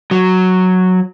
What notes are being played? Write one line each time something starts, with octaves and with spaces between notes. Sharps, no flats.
F#3